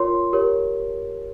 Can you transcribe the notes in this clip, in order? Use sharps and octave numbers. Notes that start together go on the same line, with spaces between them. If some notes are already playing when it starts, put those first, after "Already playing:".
Already playing: F4 A#4 C#5 C6
G4 A#4 C#5